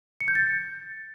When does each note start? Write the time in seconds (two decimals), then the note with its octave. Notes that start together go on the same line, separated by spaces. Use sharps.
0.20 C#7
0.28 G6
0.35 A6